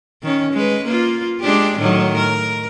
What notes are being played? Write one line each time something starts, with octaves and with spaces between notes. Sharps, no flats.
D#3 C#4
G#3 B4
A#3 F4
G#3 D4 G4
A2 D#3 F#3
A#4